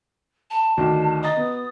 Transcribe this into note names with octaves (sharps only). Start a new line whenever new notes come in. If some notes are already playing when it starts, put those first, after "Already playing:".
A5
D2 D#3 D4
D#5 A#5 D#6 A6
B3